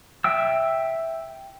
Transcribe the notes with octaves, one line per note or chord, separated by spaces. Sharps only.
E5 G5 E6